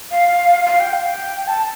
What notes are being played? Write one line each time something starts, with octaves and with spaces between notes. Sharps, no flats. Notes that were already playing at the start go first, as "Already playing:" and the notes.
F5
F5
G5
F5
G5
A5